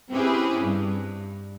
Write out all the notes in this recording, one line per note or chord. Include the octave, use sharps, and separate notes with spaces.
C4 C#4 E4 G4 G#4 B4
G2